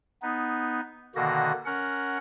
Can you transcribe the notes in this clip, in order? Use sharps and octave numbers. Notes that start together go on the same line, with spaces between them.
B3 D#4
B2 D3 D#3 A#3 F#4 A#6
C#4 A#4 F#5